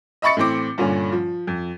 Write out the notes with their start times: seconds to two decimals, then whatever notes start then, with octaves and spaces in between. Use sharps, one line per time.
0.22 D#5 E5 B5 C#6 A6 C#7
0.37 A2 E3 C4 D6
0.78 G2 A#2 D3 C#4
1.12 F3
1.47 F2